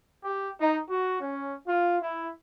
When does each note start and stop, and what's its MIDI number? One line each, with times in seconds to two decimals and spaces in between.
0.24 0.49 67
0.61 0.81 63
0.90 1.19 66
1.21 1.54 61
1.67 1.97 65
2.02 2.29 64